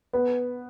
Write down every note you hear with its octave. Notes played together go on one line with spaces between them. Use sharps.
B3